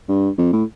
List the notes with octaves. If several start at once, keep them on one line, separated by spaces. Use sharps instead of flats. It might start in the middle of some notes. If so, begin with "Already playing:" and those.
G2
F2
A2